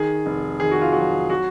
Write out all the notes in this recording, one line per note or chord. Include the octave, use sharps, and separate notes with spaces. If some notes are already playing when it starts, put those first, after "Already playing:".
Already playing: D#3 G#4
F1
D#3 G#4
F#4
F4
F#3 F#4
F#4